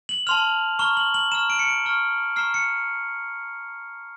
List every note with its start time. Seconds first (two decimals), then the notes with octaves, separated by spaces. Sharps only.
0.09 F#7
0.27 A5 C6 F6 F7
0.79 A#5 C#6 F6 G7
0.97 F#7
1.14 F#7
1.32 A#5 C#6 F6 E7
1.50 D7
1.59 C#7
1.67 D7
1.85 A#5 C#6 F6
2.36 A#5 C#6 F6 C7
2.54 C#7